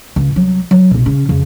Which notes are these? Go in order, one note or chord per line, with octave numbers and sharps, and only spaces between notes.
C#2
C2 F#3
F#3
B1 C3
C#3 C#4
F2 C#3